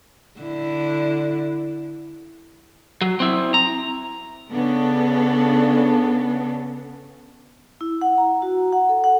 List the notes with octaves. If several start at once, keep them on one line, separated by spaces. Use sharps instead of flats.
D3 E4
F#3
C4 E4
A#5
C#3 B3 D4 A4
E4
F#5
A#5
F#4
F#5
A4
F#5